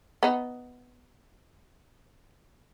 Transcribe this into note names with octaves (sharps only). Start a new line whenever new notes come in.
B3 D#4